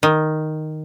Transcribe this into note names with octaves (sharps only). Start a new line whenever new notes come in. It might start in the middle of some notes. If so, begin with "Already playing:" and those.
D#3